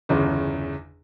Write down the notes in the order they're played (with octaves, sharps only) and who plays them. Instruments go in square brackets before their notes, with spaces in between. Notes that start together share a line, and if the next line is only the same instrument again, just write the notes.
[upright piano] G1 E2 C#3